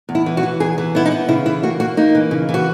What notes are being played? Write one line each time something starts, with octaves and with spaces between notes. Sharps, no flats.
E2
E4
E3
F#4
E3
E2 G#4
E3
B3 E4
D#4
B3
C#3 E4
E3 E4
A#3 F#4
A#3 F#4
A#3 D#4
E3
C#3
E3
F#4